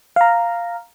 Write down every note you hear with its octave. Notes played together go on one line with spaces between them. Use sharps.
F5 A#5